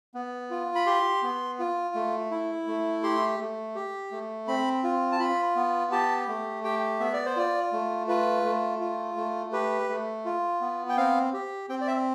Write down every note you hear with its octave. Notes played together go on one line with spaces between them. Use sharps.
B3
F4
B5
G4 C6
B3
F4
A3
E4
A3
G4 C6
A3
G4
A3
C4 B5
F4
A5
F4 B5
B3
G4 A5
A3
G4 G5
B3 E5
D5
C5
F4 D5
A3
F4 B4
A3
F4
A3
G4 B4
A3
F4
B3
G5
C4 F5
G4
C4 G5
D5
E5